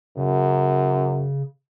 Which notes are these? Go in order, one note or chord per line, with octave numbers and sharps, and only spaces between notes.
F#2 C#3